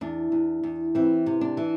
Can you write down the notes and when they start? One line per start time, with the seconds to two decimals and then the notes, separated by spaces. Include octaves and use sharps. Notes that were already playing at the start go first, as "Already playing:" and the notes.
0.01 E2 D4
0.32 E2
0.63 E2
0.95 E3 C4
1.26 C3
1.41 D4
1.57 E3